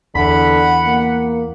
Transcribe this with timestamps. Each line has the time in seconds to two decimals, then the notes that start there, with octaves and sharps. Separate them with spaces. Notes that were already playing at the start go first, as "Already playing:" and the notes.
0.15 E2 D3 F#5 B5
0.86 A#3